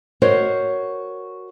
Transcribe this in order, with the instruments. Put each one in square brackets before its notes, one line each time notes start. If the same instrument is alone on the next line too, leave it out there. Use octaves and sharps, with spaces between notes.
[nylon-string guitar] F#4 A#4 C5 C#5 D#5